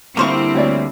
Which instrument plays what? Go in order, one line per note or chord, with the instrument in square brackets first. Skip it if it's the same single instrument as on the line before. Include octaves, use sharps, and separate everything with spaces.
[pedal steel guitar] D3 G3 A#3 [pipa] F3 C5 C#6 [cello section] C4 E4
[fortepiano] D2 C#5 D5